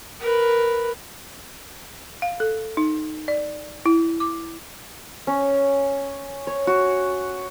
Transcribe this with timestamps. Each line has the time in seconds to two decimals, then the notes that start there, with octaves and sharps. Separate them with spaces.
0.20 A#4 B4
2.22 F5
2.40 A4
2.77 D#4
3.28 D5
3.86 E4
4.20 D6
5.27 C#4
6.47 C#5
6.67 F#4